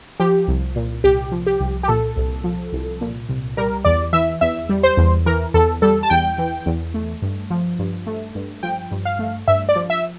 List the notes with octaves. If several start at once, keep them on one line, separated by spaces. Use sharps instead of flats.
F3 G4
C2
A#2
C2 G4
F3
G4
C2
G4
A#2 A4
C2
F3
C2
A#2
C2
G3 A#4
E2 D5
E3 E5
E2 E5
G3
C5
E2
E3 A#4
E2 A4
G3 A4
A5
E2 G5
E3
E2
A3
G2
F3
G2
A3
G2
F3 G5
G2
F5
A3
G2 E5
D5
F3
E5